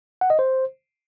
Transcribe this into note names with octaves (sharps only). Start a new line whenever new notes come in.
F#5
D#5
C5